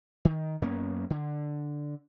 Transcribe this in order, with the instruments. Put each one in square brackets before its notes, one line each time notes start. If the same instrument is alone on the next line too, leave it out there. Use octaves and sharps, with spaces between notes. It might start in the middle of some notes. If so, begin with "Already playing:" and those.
[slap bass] D#3
F#2 A#3 B3 C#4
D3